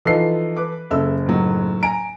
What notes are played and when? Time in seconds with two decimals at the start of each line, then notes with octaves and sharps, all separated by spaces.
0.05 E3 F3 D#4 F4 A4 C7
0.56 B4 D6
0.91 F#1 C#3 A4 E5 E6
1.26 A2 D#3 F#3
1.83 G#5 A#5 D7